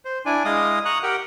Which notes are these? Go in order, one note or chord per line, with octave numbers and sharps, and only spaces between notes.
C5
D4 E4 D5 G#5
G#3 E4 D#5 F5 D#6
A#5 C#6 D#6 F#6
G4 A#4 F#5 G5